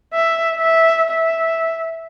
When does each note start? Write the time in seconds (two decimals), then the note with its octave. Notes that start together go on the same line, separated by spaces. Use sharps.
0.14 E5
0.56 E5
1.10 E5